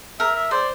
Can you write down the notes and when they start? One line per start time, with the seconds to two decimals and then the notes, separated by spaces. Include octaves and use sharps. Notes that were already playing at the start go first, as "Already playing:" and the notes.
0.20 A#4 E5
0.35 E5
0.51 C5 D5